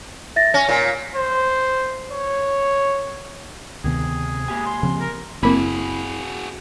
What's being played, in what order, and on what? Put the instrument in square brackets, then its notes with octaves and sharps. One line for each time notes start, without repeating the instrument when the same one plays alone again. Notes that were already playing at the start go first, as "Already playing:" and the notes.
[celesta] E5 A6 A#6
[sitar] C#4 [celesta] A#6
[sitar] A#2
[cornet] C5
C#5
[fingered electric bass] D2 D#3 B3 [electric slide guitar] C3 [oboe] G#4
[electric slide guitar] A#3 G4 G#5
[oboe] C6
[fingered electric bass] C#3 F3 C4
[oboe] A#4
[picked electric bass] F#1 A#3 [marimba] C4 [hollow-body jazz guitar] E4 B5 [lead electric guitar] F#4 G#4